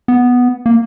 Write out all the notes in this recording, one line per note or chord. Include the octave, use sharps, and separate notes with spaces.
B3
A#3